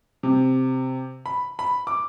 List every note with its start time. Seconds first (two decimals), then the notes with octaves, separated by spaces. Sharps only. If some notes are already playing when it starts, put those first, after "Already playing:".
0.23 C3
1.26 B5
1.59 B5
1.87 D6